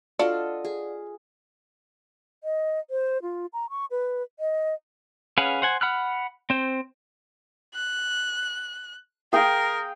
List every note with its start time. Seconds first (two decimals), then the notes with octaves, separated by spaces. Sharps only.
0.19 D4 F4 F#4 A4 D5 D#5 F#5
0.65 G#4
2.44 D#5
2.90 C5
3.22 F4
3.53 A#5
3.70 C#6
3.91 B4
4.39 D#5
5.38 C#4 G#4 B4 F5 F#5
5.62 C5 F#5 G#5
5.81 F#5 B5 F6 F#6
6.50 C4 C5
7.75 F#6
9.33 G#4 A#4 F5 G5